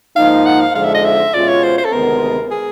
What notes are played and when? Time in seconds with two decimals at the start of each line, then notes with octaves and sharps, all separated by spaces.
0.16 G#2 F3 A#3 D#4 F5
0.46 F#5
0.60 F5
0.75 F2 D3 F3 G#3 F5
0.85 E5
0.94 D#5
1.05 E5
1.33 B2 G#3 C#4 F4 D5
1.48 C#5
1.63 C5
1.78 C5
1.85 A4
1.92 D2 C3 D#3 G#3 B3 A#4
2.51 G#4